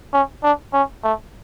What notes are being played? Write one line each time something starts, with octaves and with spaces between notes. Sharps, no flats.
C#4
D4
C#4
A3